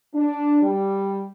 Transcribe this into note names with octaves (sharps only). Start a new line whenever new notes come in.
D4
G3